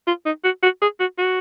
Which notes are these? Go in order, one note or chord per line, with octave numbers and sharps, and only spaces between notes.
F4
D#4
F#4
F#4
G#4
F#4
F#4